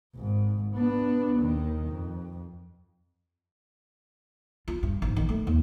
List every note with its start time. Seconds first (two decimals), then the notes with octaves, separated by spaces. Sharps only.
0.15 G#1 G#2
0.75 B3 D4
1.40 D#2 D#3
1.87 F2
4.68 F4
4.83 G2
5.02 G#1
5.17 D#3
5.29 A3
5.47 D#2